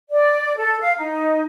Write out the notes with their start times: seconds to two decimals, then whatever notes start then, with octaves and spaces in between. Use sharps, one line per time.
0.09 D5
0.57 A4
0.81 F5
0.97 D#4